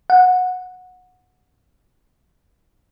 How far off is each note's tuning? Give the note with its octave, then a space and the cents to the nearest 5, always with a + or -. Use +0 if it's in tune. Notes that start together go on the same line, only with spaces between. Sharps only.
F#5 -20